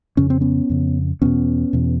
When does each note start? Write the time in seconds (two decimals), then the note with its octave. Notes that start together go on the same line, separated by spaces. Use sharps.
0.17 F2 C#3 C#4
0.30 C4
0.41 B3 C#4
0.70 F2 C#3
1.22 E2 B2 B3 C#4
1.73 E2 B2